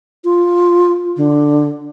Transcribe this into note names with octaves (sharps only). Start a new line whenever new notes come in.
F4
D3